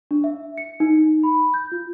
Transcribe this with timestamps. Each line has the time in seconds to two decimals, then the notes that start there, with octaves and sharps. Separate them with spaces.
0.11 D4
0.24 E5
0.58 C#7
0.80 D#4
1.23 B5
1.54 G6
1.72 F4